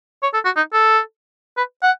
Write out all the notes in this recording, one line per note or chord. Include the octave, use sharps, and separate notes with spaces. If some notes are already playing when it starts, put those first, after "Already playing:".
C#5
A4
F#4
D#4
A4
B4
F#5